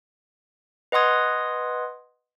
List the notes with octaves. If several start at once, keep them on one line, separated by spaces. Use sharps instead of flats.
B4 D#5 F#5 C6 D#6 G#6